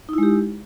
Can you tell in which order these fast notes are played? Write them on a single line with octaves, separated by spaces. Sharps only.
D#4 E4 G#3 G4